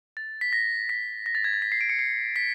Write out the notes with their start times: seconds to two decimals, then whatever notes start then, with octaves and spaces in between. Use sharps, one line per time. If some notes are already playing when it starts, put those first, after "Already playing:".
0.17 A6
0.41 B6
0.53 A#6
0.89 B6
1.26 A#6
1.35 A6
1.44 G#6
1.53 A6
1.62 B6
1.72 C7
1.81 D7
1.89 C#7
1.99 C7
2.36 B6